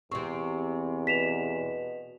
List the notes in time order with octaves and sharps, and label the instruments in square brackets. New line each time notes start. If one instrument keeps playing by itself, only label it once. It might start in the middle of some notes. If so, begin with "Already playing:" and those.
[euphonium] E2 [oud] C3 C4 [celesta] C#6
[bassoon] B2 [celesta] B6 E7 F7